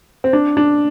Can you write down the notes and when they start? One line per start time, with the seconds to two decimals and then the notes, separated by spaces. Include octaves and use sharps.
0.24 C4
0.33 D4
0.57 D4